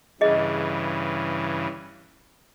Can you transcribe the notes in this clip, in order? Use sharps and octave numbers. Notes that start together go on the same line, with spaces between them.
G2 C#3 E3 G#4 D#5